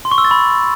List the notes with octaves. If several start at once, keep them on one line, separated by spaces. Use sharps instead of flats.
C6
C#6
E6
A6
B5